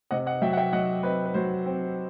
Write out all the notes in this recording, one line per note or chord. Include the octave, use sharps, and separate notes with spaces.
C3 D#5 F#5
D#5 F#5
F#3 E5 G5
F#5
E5 G5
F#3 D#5 F#5
C4 B4 D#5
B4
F#3 C5
C4